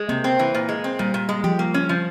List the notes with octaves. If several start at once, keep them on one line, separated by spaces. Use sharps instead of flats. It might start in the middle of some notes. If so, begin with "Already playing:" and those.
Already playing: G#3
C3 A#3
C4
E3
A#2
G#3
C4
A#2 G3
A#2
G#3
F3 G4
A#3
C#4
F3